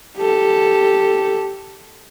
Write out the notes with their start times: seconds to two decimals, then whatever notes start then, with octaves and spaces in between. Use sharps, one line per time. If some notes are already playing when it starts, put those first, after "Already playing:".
0.18 G4 A4